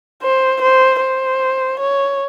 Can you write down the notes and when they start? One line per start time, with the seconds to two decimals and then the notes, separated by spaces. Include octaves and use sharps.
0.23 C5
0.62 C5
1.01 C5
1.80 C#5